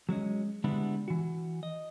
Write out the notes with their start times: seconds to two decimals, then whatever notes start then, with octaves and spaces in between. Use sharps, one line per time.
0.09 F#3 G#3 C#4 D#5
0.64 D3 G3 G#3 B3 D4 E4
1.08 E3 F#4
1.63 D#5